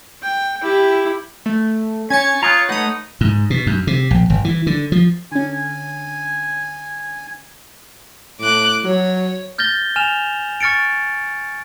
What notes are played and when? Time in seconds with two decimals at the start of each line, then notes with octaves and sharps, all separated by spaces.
0.23 G5
0.62 E4 G4
1.46 A3
2.10 C#4 C#5 G#5 G#6 A6 C#7
2.43 F4 A#5 D#6 F#6
2.69 A3 D#4 B4 F#5 D#6
3.21 G#2
3.50 B2
3.67 F#2
3.87 C3
4.11 A#1
4.30 G1
4.45 E3
4.67 D3
4.92 F3
5.32 D3 C#4 G#5
8.40 A2 D6 F#6
8.84 F#3 C#5
9.58 F6 G6 A6 A#6 G7
9.96 G#5 F6 E7 F7
10.61 C#6 F6 A6 C#7 D7